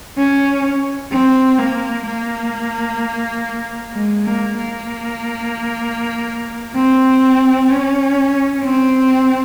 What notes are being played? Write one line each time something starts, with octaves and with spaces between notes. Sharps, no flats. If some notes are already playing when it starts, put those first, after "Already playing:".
C#4
C4
A#3
A#3
G#3
A#3
A#3
C4
C#4
C4